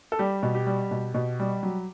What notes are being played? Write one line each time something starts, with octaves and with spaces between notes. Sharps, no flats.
A4
G3 G4
B2
G4
G3
B2
B2
G3
F#3